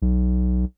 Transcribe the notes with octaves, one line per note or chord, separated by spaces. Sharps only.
B1